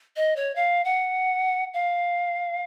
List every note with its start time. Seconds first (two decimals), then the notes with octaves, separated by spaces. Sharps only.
0.16 D#5
0.36 C#5
0.56 F5
0.85 F#5
1.74 F5